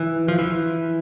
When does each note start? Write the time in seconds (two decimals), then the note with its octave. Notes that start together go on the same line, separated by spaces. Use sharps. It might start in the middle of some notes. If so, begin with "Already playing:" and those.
Already playing: E3
0.28 F3
0.39 E3